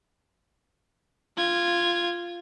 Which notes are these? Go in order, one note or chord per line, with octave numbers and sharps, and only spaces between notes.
F4 G#6